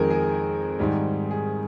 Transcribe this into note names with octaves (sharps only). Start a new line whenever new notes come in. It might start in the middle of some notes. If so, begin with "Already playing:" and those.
Already playing: F2 D#3 G#3 G#4 A#4
G#4
G#2 D#3 G3
G#4